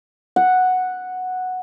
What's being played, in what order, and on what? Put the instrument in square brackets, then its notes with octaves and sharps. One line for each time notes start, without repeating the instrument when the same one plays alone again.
[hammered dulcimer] F#5